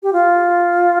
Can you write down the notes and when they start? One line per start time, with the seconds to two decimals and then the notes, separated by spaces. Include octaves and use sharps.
0.03 G4
0.13 F4